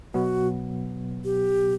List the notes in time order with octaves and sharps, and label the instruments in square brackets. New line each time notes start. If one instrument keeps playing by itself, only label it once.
[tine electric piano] B2 F#3 B3 [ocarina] F#4
[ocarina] G4